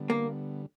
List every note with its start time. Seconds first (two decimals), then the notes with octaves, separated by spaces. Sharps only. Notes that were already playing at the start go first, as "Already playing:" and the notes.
Already playing: D3 G3 B3
0.10 A#3